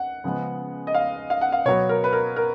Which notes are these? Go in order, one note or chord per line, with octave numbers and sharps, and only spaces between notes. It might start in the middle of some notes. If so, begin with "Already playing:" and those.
Already playing: F#5
C#3 F3 G#3 B3
D#5
F5
F5
F#5
F5
B2 F#3 B3 C#5
A#4
B4
A#4
A#4